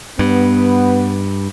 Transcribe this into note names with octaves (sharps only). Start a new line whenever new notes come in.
G2 B3